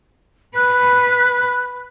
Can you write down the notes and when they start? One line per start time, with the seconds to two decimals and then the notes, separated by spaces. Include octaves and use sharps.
0.56 B4 F#6